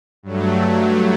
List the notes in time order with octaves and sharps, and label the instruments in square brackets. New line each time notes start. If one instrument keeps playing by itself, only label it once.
[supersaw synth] G2 F#3 A3